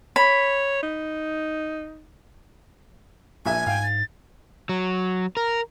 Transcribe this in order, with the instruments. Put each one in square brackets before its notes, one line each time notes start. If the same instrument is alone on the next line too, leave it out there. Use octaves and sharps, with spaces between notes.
[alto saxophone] C#5 [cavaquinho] B5
[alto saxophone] D#4
[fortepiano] A#1 E5 [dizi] G#5
[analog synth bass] G#2 [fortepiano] F5 [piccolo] G5
[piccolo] A6
[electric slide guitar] F#3
A#4